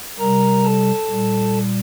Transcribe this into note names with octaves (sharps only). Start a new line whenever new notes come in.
C3 G3 A#4 A#5
A4 A5
A#2 G3